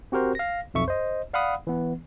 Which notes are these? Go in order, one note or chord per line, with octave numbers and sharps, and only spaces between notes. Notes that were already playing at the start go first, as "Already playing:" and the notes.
C4 F#4 G4 A#4 C5
F5 A#6
B1 F2 E5 C#6
C5 D#5
D5 F5 F#5 B5 D#6
E3 B3